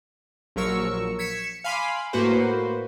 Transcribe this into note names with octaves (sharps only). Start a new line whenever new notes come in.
A#1 F3 F#3 A#4 C#6 E6
G#6 B6 C#7 E7
F5 G#5 B5 C6 D6 F6
A2 A#3 F#4 B4 C5